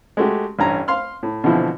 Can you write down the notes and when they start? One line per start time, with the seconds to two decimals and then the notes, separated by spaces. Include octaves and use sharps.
0.17 G#3 A3 F#4 G4
0.59 A1 G2 C#4 A#5
0.88 F5 C6 F6
1.23 A2
1.44 B2 D3 E3 F3 C4 E4